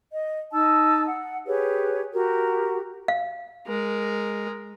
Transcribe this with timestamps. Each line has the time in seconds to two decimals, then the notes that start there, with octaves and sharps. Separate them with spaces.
0.13 D#5
0.52 D#4 A5 E6
1.06 F#5
1.46 G4 G#4 B4 C#5
2.13 F#4 G4 A#4
3.08 F5
3.67 G#3 A#4